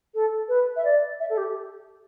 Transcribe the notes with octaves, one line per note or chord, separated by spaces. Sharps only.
A4
B4
E5
D5
E5
A4
G4